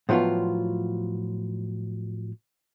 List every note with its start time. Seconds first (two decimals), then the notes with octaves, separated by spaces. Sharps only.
0.09 A2 F3 F#3 B3 F4